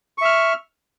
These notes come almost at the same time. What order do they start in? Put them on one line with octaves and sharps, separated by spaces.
C#6 E5 F6